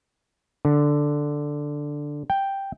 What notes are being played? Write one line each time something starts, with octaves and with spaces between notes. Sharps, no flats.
D3
G5